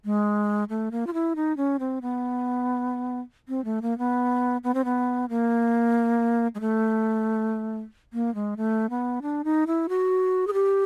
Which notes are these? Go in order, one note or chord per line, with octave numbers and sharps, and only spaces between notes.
G#3
A3
A#3
F4
E4
D#4
C#4
C4
B3
C4
A3
A#3
B3
B3
C4
B3
A#3
G#3
A3
A#3
G#3
A3
B3
D4
D#4
E4
F#4
G#4
G4